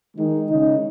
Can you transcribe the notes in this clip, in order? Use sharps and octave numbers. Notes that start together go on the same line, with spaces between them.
D#3 G#3 D#4
C#3 G#3 D#4